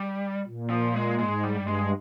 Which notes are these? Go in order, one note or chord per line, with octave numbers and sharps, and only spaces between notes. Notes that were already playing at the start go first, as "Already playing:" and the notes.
Already playing: G3
A#2
F3
G#3
G#2 G#3
G3
G2
G#3